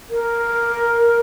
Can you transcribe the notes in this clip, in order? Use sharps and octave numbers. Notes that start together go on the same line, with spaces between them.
A#4